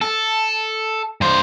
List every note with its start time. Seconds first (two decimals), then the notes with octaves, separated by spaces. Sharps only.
0.01 A4
1.21 G2 C5